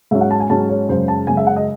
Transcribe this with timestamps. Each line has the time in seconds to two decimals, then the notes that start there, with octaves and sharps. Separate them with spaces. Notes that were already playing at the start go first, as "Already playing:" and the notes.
0.11 G#2 F#3 C#4 E5
0.21 F#5
0.31 A5
0.40 G#5
0.50 G#2 F#3 C#4 A5
0.69 C#5
0.89 F#2 C#3 G#3 C5
1.08 A5
1.27 F#2 C#3 G#3 G#5
1.37 E5
1.47 F#5
1.56 D#5